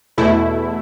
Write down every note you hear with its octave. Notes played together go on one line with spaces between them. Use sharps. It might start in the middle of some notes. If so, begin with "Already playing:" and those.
E2 B2 A3 E4